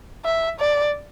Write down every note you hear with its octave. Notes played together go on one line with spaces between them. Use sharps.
E5
D5